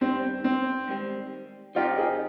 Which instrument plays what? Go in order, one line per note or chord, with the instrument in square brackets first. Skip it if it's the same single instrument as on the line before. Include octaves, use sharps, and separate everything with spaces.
[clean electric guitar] G2 D#3 G3 [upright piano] C4
[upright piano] C4
[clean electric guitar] G#2 D#3 G3 C4
[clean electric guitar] F3 C4 D#4 G4 [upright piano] F4
[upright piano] G#4